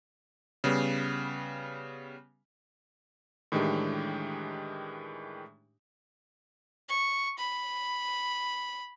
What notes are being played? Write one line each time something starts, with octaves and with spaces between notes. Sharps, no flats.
C#3 G3 B3
A2 D#3 E3 G#3 D4 G4
C#6
B5